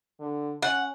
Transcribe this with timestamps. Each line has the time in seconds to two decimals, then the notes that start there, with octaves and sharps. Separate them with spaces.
0.20 D3
0.62 C#4 F#5